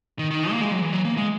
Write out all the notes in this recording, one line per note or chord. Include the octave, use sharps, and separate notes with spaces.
D#3
D#3
A#3
G#3
F#3
E3
F#3
A#3
G#3